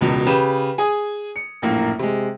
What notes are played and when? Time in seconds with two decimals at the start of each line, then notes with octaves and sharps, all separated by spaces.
0.01 E1 C#2 B2
0.27 C#3 G4 B4 E7
0.78 G#4 G#5 D#6
1.36 C#7
1.62 A#1 F#2 A2 A#3
1.99 C3 G#3